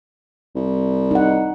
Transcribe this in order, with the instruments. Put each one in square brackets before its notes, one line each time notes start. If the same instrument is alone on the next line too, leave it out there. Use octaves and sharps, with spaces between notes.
[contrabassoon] C2
[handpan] D#4 F#5